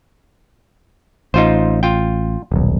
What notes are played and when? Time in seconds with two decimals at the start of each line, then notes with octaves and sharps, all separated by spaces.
1.34 A1 D#4 F4 C5
1.83 F4 G5
2.52 D#1 B1